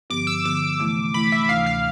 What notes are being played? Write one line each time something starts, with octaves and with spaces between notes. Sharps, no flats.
G2 D3 F3 B3 D6
E6
G2 D3 F3 B3 D6
C3 E3 A3 E4
C3 E3 A3 E4 B5
E5
D2 C3 E3 F5
F5